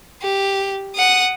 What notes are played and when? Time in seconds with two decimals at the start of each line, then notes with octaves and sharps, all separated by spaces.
0.22 G4
0.96 F#5 D#6